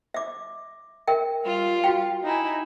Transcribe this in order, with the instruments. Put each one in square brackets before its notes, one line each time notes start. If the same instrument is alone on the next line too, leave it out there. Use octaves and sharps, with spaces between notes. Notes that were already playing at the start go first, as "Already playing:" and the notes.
[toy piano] E5 D6
A#4 E5 G5
[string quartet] G3 F4 F5
[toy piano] F#4 G5
[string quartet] D#4 E4 G#5